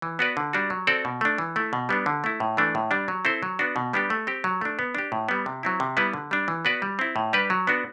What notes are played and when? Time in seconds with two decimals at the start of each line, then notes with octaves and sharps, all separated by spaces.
0.02 E3
0.19 B3 F#4 B4 D5
0.37 D3
0.53 G3 D4 F#4
0.70 F#3
0.87 C4 F#4 A4 D5
1.05 B2
1.21 A3 D4
1.38 E3
1.56 A3 E4
1.73 B2
1.89 G3 B3 D4
2.06 D3
2.24 A3 E4
2.40 A2
2.57 E3 A3 D4
2.75 A2
2.91 G3 D4
3.08 F#3
3.25 C4 E4 A4 C5
3.43 F#3
3.59 B3 D4 F#4
3.76 B2
3.93 G3 B3 D4 G4
4.10 A3
4.27 C4 G4
4.44 F#3
4.61 A3 D4
4.79 B3
4.95 D4 G4
5.12 A2
5.29 G3 B3
5.46 C3
5.63 F#3 C4 E4
5.80 C3
5.97 G3 B3 E4 B4
6.13 D3
6.31 G3 D4
6.48 E3
6.65 B3 F#4 B4 D5
6.82 G3
6.99 C4 E4
7.16 A2
7.33 G3 D4 G4 B4
7.50 F#3
7.67 B3 D4 F#4